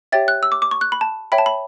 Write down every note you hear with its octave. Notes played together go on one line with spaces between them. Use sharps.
G4 C#5 E5 G5 A6
F#6
E6
D6
D6
C#6
F#6
B5
A5
C#5 E5 G5 B5
A5
B5